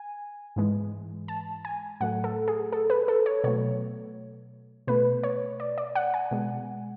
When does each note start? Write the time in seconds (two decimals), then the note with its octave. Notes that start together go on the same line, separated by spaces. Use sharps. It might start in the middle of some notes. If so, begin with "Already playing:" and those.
Already playing: G#5
0.56 G#2 E3 G#3
1.28 A5
1.65 G#5
2.00 A2 F#3 A3 F#5
2.24 A4
2.48 G#4
2.72 A4
2.90 B4
3.08 A4
3.26 C#5
3.44 B2 F#3 A3 C#5
4.87 B2 A3 B4
5.23 C#5
5.60 D5
5.78 D5
5.95 F#5
6.14 G#5
6.31 B2 G#3